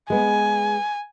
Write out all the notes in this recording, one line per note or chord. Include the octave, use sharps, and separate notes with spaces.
G#3 B3 G#5